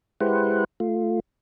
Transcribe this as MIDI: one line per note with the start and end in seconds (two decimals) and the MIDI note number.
0.21 0.64 56
0.21 0.64 64
0.21 0.64 67
0.21 0.64 71
0.21 0.64 72
0.21 0.64 78
0.80 1.20 57
0.80 1.20 65